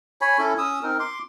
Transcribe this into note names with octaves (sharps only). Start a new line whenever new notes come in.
C#5 G#5 B5
C#4 E4 A4
C#4 D#6 E6
C4 D#4 A#4
C6 D6